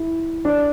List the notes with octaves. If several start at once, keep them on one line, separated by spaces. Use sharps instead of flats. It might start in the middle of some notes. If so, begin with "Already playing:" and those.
Already playing: E4
D4